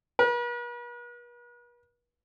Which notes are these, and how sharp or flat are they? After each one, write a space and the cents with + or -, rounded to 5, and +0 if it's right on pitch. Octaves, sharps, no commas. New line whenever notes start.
B4 -45